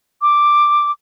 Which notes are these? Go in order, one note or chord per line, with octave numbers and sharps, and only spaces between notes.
D6